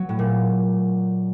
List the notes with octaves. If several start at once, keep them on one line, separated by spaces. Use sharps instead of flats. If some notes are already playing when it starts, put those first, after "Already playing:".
Already playing: F#3
A2
A#2